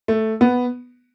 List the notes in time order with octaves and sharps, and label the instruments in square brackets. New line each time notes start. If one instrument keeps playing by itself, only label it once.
[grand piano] A3
B3